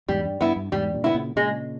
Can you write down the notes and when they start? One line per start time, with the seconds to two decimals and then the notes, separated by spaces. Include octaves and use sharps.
0.08 E2 G#2 G3
0.25 G2
0.41 G2 B3 E4
0.56 G2
0.72 E2 G#2 G3
0.94 G2 A#2
1.04 B3 E4
1.14 A#2 C#3
1.36 A#2 C#3 G#3